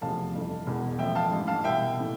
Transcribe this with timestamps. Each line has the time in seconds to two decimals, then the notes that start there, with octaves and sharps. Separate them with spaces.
0.01 F1 E2 C3 F3 F5 A5
0.34 G1 F2 E3
0.67 E1 E2 B2
0.99 A1 A2 F3 E5 G5
1.15 F5 A5
1.31 A1 G2 E3
1.47 F5 A5
1.64 C2 B2 E5 G5
1.98 A2 E3